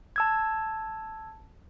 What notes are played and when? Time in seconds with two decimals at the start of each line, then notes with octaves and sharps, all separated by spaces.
0.16 A5 E6 G#6